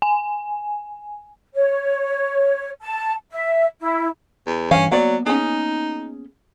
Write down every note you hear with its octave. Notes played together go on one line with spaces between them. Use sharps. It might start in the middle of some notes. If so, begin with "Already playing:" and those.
G#5
C#5
A5
E5
E4
E2
G2 E3 C#4 F5
F#3 A#3 B3 D5 F#5
C#4 D#4 G#4